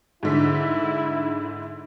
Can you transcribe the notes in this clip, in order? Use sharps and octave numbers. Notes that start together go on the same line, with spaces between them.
G#2 D3 E4 B6